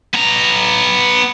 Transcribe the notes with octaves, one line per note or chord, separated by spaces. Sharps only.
B3 A#5